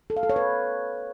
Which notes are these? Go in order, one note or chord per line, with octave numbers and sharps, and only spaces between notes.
A4
F5
A4
C#5
B4